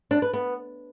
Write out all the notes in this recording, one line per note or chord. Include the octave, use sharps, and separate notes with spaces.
D4
B4
B3